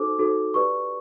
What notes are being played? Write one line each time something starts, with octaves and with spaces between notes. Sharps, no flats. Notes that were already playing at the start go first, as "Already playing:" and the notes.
Already playing: D#4 F#4 A4 C5 D6
D#4 F#4 A4 C5
G4 B4 D5 C#6